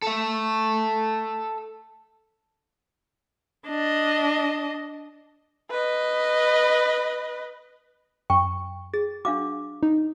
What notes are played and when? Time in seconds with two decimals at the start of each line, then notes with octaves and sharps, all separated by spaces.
0.02 A4 E5
3.67 D4 D#5
5.70 B4 D#5
8.30 F#2 G5 C#6
8.94 G#4 A6
9.25 D4 F#4 F5 D6
9.83 D#4